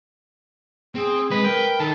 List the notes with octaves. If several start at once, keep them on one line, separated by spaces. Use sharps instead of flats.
C4 G#4
G#3 B4
A#4 G5
D#3 A4 A5